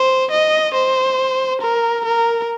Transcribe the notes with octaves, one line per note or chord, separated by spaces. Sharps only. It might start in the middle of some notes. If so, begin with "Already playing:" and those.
Already playing: C5
D#5
C5
A#4
A#4